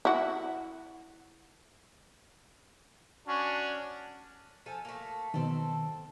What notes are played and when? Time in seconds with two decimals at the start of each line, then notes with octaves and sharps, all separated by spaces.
0.05 E4 F#4
3.27 C#4 D4 F#4
4.66 F3 A4 G#5
4.85 A3 A#3
5.34 B2 D#3 C4 A4